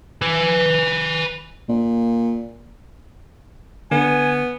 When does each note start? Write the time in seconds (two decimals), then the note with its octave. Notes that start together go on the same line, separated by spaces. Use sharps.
0.22 B4 G#5
1.69 A#2
3.91 D3 B3 G#5